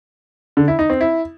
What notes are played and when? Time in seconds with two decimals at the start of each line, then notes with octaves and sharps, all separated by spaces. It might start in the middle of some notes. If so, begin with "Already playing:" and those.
0.57 D3
0.68 E4
0.79 D#4
0.90 C4
1.01 E4